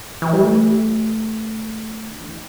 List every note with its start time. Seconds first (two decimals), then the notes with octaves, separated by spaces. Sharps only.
0.22 E3
0.33 G3
0.43 A3
2.11 D3
2.19 E3